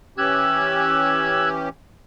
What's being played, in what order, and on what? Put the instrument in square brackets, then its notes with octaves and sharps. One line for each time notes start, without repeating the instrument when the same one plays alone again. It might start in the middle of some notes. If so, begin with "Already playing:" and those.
[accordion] E3 C#4 G4 [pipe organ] E6 F#6 G#6